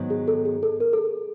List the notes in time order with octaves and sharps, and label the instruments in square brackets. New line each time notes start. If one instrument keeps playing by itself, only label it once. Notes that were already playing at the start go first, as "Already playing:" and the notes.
Already playing: [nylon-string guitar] G#2 D#3 F#3 B3
[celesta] G#4
A4
G#4
A4
A#4
A4
G#4